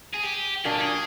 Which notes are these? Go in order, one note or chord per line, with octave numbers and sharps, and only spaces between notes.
G#4
G4
A#2 F#3 A#3 D4 G#4
G4
G#4